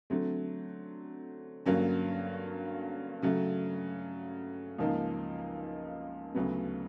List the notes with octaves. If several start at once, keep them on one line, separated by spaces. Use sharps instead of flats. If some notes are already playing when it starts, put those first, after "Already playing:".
D3 F#3 A3 C4
G2 D3 F#3 A#3 C#4
C#3 F#3 A3
C#2 C#3 F3 A#3 D#4
D2 C#3 F#3 B3